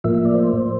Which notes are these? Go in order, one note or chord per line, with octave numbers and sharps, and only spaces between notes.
A2 F3 A#3 E5
E5
D5
C5